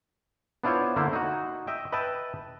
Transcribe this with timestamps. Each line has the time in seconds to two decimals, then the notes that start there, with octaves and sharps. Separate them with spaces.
0.64 B3 D4 E4 F4 C5 C#5
0.96 D3 A#3 E4 C5
1.13 D#4 F#4
1.67 D#5 E5 G5
1.92 B4 D#5 E5 G5 A5